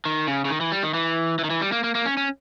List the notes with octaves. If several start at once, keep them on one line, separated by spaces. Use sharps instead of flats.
D#3
C#3
C#3
D#3
E3
G3
D#3
E3
E3
D#3
E3
G3
A#3
A#3
A#3
C#4
C#4